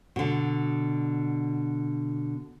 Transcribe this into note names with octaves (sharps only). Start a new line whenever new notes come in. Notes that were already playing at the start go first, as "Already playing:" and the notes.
B2 D3